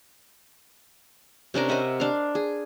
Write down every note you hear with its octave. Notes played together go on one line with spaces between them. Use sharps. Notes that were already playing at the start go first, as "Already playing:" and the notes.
C3 C#4 D4 A#4
C5 D#5 E5 F#5
D4 F5
G#4